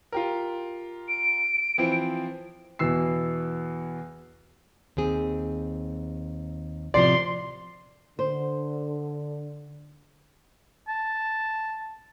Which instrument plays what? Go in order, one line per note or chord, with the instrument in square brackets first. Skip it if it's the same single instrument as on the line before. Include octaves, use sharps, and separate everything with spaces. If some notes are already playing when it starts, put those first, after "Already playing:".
[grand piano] F4 G4 A#4
[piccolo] D7
[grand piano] E3 F3 C4
E2 B2 E3 E6 C7
[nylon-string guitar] D#2 C4 G#4
[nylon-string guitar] A2 C3 F3 [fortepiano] D5 [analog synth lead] C6
[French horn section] D3 [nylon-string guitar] C5
[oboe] A5